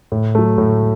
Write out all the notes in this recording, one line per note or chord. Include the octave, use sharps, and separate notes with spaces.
A2
F#3 A3
A2